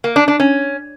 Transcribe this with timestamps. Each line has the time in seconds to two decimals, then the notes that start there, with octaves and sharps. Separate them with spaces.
0.04 A#3
0.16 D4
0.28 D4
0.40 C#4